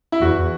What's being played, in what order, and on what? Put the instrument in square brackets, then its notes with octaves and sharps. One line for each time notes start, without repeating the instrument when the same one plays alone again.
[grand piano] E4
[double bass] E2 [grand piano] F#4